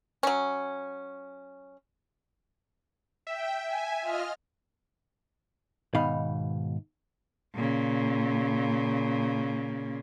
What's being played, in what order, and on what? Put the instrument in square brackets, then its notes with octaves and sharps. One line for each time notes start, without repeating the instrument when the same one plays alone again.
[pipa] F#3 C#4
[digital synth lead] E5 [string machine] G5
[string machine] G#5
F4 D#5 F6
[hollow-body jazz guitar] G#2 B2 D#3 D#4 F5 B5
[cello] A#2 C#3